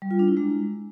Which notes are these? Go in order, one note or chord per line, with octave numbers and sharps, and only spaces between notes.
G3
F4
D4
E4
G#3